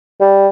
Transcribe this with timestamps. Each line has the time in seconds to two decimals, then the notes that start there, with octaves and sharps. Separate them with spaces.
0.21 G3